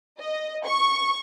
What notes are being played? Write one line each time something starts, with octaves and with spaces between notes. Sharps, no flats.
D#5
C#6